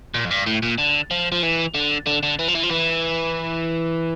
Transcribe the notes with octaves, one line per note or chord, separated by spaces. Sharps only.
A#2
F2
G2
A2
A#2
D3
F3
F3
E3
D3
D3
D3
E3
F3
E3
F3
E3